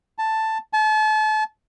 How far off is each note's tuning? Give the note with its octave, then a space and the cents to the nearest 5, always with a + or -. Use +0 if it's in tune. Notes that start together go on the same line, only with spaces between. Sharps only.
A5 +5
A5 -35